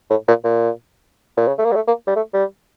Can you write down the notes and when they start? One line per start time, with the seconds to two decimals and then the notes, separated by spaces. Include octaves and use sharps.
0.10 A2
0.28 A#2
0.44 A#2
1.37 A#2
1.48 C#3
1.58 A3
1.65 A#3
1.72 G3
1.75 A3
1.88 A#3
2.07 G3
2.16 A3
2.34 G3